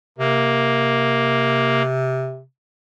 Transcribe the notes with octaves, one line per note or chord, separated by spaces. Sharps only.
C3 A#3